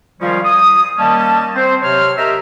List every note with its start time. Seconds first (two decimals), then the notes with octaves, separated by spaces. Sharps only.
0.20 D#3 F3 G3 G#3 C#4 F4
0.44 D#6
0.98 D#3 G3 A#3 C#4 D#5 A5
1.55 C4 C5
1.82 C3 F#3 C#5 C6 F6
2.17 G4 A#4 D#5 E5 G5 A#5